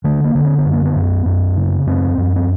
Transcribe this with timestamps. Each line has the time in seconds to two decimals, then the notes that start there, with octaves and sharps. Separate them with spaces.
0.04 D3 A3
0.24 A#3
0.35 D3
0.45 C4
0.59 B3
0.66 F#2
0.72 A#3
0.86 B3
0.96 F#2
1.26 F#2
1.57 C#3
1.87 F#2 C4
2.18 F#2
2.36 C4